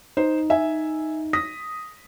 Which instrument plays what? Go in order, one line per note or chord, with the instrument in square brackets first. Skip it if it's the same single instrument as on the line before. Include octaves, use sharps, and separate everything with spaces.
[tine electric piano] D#4 [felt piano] C5
[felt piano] E5 G#5
D#6 A#6 B6